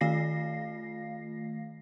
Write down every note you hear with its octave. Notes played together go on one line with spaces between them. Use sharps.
D#3 A3 F4 F5 A#6 C7